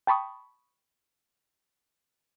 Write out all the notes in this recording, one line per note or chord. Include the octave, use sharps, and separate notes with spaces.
G5 A5 B5 C#6 D#6